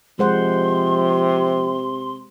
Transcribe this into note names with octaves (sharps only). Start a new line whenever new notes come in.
C3 F3 G#3 C5 F#5 C6